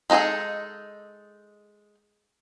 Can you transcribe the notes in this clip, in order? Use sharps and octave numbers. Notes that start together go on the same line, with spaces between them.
G#3 D#4 F#4 G#4 A4